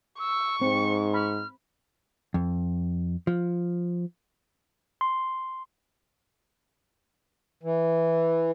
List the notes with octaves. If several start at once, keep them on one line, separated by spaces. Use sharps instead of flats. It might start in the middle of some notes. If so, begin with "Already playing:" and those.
C#6 E6
G#2 C4 C#7
B5 F6
F2
F3
C6
E3